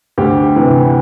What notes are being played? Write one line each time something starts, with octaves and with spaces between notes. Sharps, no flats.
D2 G4
C3 E3